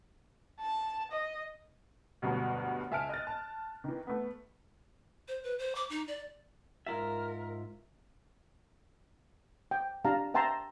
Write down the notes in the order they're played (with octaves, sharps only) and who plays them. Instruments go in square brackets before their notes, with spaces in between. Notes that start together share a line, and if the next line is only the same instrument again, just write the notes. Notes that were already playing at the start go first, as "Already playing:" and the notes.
[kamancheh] A5
D#5
[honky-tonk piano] D2 G2 B2 F#3
C#2 E5 G#5 A5 F6 D7
D#5 F#6 A6
A5
D#3 E3
A3 B3
[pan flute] C5
B4
C5
D6
D#4
D5
[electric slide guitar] G#2 F4 E5 [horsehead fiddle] A#4
[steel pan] G5
D4 G4 F5 A5 A#5
E5 G5 A5 A#5 C6